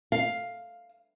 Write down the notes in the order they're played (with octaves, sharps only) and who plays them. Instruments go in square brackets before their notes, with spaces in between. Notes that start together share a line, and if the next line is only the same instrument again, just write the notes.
[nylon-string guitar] F5